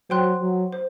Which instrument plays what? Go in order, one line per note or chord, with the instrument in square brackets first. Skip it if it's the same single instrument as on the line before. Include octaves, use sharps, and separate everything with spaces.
[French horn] F#3 [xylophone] C5 G5 C6 F#6
[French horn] F#3
[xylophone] C5